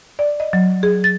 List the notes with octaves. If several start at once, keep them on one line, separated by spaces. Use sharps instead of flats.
D5
D#5
F#3
G#4
A6